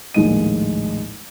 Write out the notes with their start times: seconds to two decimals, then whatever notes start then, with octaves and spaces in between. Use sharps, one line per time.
0.14 A#1 D#2 A2 G#3 D#5 D#7